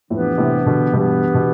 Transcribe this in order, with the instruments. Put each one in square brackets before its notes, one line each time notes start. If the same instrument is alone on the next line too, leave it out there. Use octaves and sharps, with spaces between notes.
[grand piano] F2 A2 [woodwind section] E3 B3 D4 G4 B4
[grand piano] A2 C3
B2 D3
[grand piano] G2 B2 [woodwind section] E3 B3 D4 G4 B4
[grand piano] B2